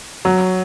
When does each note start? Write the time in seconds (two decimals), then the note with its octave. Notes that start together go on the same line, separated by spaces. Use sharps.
0.25 F#3